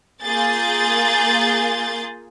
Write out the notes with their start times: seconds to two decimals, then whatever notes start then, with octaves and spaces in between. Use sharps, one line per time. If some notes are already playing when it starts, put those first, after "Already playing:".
0.23 A#3 F4 G#4 G6 A6